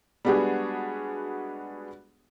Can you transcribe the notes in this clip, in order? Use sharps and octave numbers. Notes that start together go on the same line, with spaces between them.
G3 G#3 B3 D4 F#4 G#4